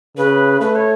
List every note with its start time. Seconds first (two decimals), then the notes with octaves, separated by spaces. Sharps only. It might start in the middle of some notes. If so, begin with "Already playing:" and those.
0.17 C#3 B4
0.61 A3 B4
0.76 C#5